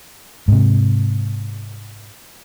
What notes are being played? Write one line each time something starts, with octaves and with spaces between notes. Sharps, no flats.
G#2 C3